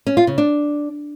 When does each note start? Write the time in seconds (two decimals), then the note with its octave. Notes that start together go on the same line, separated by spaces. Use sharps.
0.07 C#4
0.17 F4
0.27 C#3
0.38 D4